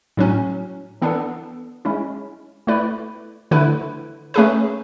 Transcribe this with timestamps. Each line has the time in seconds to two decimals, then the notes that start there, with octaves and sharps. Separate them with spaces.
0.17 A2 F#3 C#4
1.02 E3 B3 D4 A4
1.85 G#3 C#4 E4
2.67 A3 E4 B4 D5
3.51 D3 A3 E4 B4
4.34 A3 C#4 G#4 B4